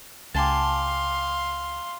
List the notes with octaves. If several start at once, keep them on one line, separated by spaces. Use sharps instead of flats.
C#2 G4 F5 G#5 A5 C6